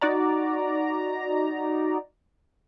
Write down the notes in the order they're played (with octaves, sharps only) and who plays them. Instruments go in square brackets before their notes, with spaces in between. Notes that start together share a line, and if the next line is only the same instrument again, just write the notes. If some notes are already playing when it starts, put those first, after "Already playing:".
[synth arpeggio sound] D#4 F#4 D5 A#5